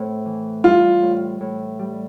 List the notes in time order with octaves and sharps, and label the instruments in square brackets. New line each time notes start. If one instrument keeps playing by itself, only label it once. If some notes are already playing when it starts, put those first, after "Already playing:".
Already playing: [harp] A2 C4
E3
[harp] G3 [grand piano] F4
[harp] A2
A2
G3